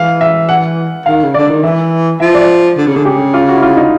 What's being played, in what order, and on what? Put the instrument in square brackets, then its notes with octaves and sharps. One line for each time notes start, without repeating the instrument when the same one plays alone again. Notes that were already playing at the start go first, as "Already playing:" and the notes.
Already playing: [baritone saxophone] E3 [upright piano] F5
[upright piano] E5
F#5
[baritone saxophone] D#3 [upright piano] F5
[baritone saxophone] C#3
[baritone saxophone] D3 [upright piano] D5
[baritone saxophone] D#3
[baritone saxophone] E3 [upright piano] E5
[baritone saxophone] F3 [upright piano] E5
[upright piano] D5
[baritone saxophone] D3
C#3
[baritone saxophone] D3 [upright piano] G#4
[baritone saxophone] C#3 [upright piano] G4
[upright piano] F4
F#4
E4
F4
D#4